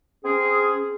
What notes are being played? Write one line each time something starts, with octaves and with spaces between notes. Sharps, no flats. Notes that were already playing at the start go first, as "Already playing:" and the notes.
C4 C#4 G#4